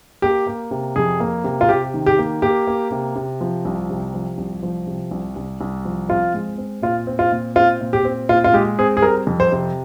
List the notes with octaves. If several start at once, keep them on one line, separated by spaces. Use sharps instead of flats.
A#3 G4
A#3
C3
F2 G#4
A#3
C3
F4
C3 G4
D#3
G4
A#3
A#3 G4
A#3
C3
C3
F3
C2
C3
F3
C2
F3
C3
C2
C2
C2
F3
C4 F4
G#3
C4
A#2 F4
C4
F4
A#2
C4 F4
A#2
G4
C4
A#2 F4
F4
G#3 G4
C4 G#4
G#4
G3 A#4
F2
C5
C3